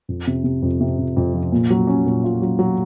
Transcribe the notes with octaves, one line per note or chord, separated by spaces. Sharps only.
F2
C3
C3
F2
C3
F2
F2
F3
A#2
F#3
C#4
A#2
F4
F#3
F#3